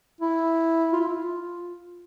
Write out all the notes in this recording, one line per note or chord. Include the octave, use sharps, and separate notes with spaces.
E4
F4
E4
F4